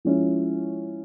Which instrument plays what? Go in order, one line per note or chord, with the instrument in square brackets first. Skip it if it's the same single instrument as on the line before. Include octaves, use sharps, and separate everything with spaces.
[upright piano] F3 G#3 C#4 E4